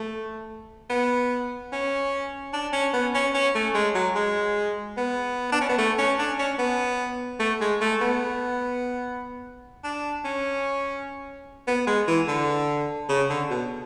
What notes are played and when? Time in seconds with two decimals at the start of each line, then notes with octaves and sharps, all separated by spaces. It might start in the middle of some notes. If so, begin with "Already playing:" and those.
Already playing: A3
0.90 B3
1.72 C#4
2.53 D4
2.73 C#4
2.93 B3
3.15 C#4
3.34 C#4
3.55 A3
3.74 G#3
3.95 F#3
4.15 G#3
4.97 B3
5.52 D4
5.61 C#4
5.69 B3
5.78 A3
5.98 C#4
6.19 D4
6.39 C#4
6.59 B3
7.40 A3
7.61 G#3
7.81 A3
8.01 B3
9.84 D4
10.25 C#4
11.68 B3
11.87 G#3
12.08 E3
12.28 D3
13.09 C#3
13.30 D3
13.50 B2